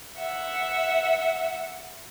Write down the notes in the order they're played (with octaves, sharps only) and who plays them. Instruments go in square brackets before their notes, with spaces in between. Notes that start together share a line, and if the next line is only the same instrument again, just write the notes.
[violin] E5 F#5